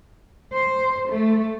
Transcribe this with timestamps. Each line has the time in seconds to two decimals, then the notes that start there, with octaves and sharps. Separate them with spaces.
0.54 C5
1.09 A3